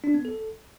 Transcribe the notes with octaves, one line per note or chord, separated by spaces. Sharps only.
D4
B3
A4